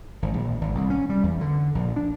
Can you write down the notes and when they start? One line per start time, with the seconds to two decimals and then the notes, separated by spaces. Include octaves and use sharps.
0.22 G#1
0.34 A#1
0.61 G#1
0.75 C2
0.90 C#4
1.10 G3
1.23 E2
1.41 D3
1.75 A#1
1.96 D4